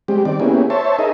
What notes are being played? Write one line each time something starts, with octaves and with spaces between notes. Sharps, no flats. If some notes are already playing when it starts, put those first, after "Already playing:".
G3 G#3 C4 G4
D#3 C4 D5
A#3 B3 C#4 E4 G4 G#4
C5 C#5 E5 A5
D#4 G#4 A#4 D#5 E5